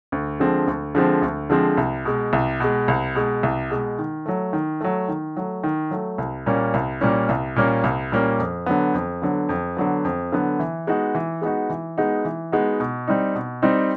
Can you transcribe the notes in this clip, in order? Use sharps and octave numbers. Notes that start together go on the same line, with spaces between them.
D2
D3 F3 G#3 C4
D2
D3 F3 G#3 C4
D2
D3 F3 G#3 C4
C2
B2 G#3
C2
B2 G#3
C2
B2 G#3
C2
B2 G#3
D#3
F#3 A3
D#3
F#3 A3
D#3
F#3 A3
D#3
F#3 A3
C2
A#2 G3 A#3 C#4
C2
A#2 G3 A#3 C#4
C2
A#2 G3 A#3 C#4
C2
A#2 G3 A#3 C#4
F2
D3 F#3 B3
F2
D3 F#3 B3
F2
D3 F#3 B3
F2
D3 F#3 B3
E3
G#3 B3 D#4 F#4
E3
G#3 B3 D#4 F#4
E3
G#3 B3 D#4 F#4
E3
G#3 B3 D#4 F#4
B2
G3 C4 D#4
B2
G3 C4 D#4